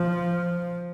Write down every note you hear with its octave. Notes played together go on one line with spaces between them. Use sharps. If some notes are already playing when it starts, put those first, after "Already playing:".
Already playing: F3